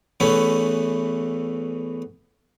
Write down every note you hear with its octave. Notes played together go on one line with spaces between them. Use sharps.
E2 E3 A3 B3 C#4